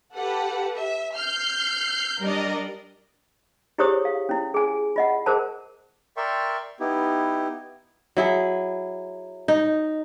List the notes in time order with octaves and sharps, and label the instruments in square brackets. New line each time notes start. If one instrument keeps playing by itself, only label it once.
[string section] G4 A4 B4 F#5
E5
F6 G6 C7
G3 D4 A#4 D5 D#5
[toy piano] E4 G4 G#4 C5 C#5 D#6
F5
C#4 E4
G#4 G#5
F4 D#5 F#5
G#4 A#4 C5 A5
[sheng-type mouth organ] A#4 D5 E5 G5 C6 C#6
B3 D#4 E4 G4
[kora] F#3 E4 G#4
D#4